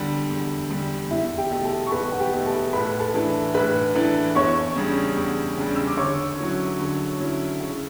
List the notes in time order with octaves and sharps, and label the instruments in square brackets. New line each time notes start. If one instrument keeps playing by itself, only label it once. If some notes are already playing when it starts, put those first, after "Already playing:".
Already playing: [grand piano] E2 D3 G3
E2
D3 G3
[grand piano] E2 [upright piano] E4 E5
[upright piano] G4 G5
[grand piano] B2 A3
[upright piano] A4 A5
C#6
[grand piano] E2 [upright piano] B4 B5
[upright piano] F#5
G4 G5
[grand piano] B2 A3
[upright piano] A4 A5
[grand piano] A2 [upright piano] B4 B5
[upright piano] A4 A5
[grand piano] E3 A3 D4
[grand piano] A2 [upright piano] B4 B5
[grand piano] E3 A3 D4
[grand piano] E2 [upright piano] C#5 C#6
[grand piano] C#3 G3 D4
E2
C#3 G3 D4
[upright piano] E6
D6
[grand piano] D3 [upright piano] C#5 C#6
[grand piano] F#3 C#4 E4
D3
F#3 C#4 E4
C#3